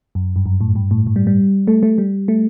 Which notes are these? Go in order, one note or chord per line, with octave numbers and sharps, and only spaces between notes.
F#2
G2
F#2
A2
G2
A2
A2
G3
G3
A3
A3
G3
A3